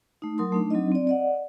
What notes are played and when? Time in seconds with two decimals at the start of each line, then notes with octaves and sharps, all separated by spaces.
0.22 A3 D#4
0.38 F#3 A#4 C6 D#6
0.52 A3 D4 D#4
0.70 F#3 C4 D4 D#4 D#5
0.92 C4 D5
1.07 D5 D#5 F#5